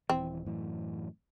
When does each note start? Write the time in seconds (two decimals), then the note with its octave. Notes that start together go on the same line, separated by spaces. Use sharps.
0.10 D#1 E3 C4
0.46 F#2 A2 E3